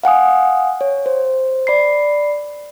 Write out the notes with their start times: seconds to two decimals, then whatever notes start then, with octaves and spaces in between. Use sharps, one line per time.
0.03 F5 F#5 G#5 D#6
0.81 C#5
1.06 C5
1.67 D5 B5 C7